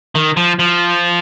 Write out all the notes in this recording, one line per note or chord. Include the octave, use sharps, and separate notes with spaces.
D#3
F3
F3